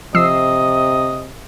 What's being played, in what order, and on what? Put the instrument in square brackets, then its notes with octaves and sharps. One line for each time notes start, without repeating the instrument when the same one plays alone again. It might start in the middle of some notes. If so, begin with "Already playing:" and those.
[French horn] C3 [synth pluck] F3 E6 C7 [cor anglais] D#5